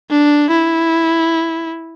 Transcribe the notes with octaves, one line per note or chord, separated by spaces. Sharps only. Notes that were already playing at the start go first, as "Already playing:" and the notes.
D4
E4